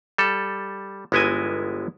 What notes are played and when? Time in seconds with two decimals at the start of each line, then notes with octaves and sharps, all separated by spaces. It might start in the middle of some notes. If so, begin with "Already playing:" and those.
0.18 G3 A4
1.12 G1 G#3 B3 E4 D#5 G#5